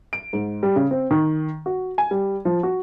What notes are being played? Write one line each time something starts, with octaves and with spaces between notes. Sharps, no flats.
D7
G#2
G3
C#3
C4
D#3
F#4
G#5
G3
F3
F#4